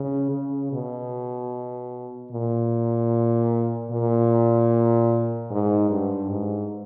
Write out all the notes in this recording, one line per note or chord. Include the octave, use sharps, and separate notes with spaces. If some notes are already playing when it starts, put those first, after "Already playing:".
Already playing: C#3
C#3
B2
A#2
A#2
G#2
G2
G#2